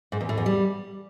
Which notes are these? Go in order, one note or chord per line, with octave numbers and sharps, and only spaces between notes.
G#2
E2
A2
E2
G3